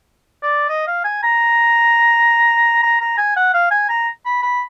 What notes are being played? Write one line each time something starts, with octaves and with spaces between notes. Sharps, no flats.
D5
D#5
F5
G#5
A#5
A#5
A#5
G#5
F#5
F5
G#5
A#5
B5
B5